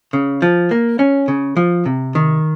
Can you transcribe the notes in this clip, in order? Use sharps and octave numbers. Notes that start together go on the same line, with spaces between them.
C#3
F3
A#3
C#4
C#3
F3
C3
D#3